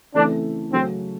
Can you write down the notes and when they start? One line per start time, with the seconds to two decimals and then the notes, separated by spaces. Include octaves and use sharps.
0.14 C#3 E3 A3 C4 D4
0.72 C#3 F#3 A3 C4 C#4 F#4